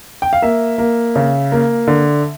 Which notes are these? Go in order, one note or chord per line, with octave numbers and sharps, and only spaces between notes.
G5
F5
A#3 E5
A#3
C#3
A#3
D3